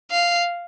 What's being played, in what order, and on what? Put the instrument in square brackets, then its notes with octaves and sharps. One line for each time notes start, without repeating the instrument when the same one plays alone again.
[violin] F5